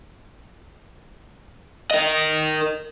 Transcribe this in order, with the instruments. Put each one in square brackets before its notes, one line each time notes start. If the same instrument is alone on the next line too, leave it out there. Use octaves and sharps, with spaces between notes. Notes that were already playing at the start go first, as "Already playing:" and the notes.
[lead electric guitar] A#4 D#5